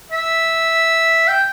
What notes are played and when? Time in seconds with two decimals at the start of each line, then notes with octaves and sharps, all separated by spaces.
0.12 E5
1.28 G5